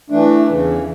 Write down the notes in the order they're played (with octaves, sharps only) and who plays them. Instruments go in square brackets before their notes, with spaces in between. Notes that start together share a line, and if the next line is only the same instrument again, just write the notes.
[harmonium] E3 A3 D4
E2 C#3 E3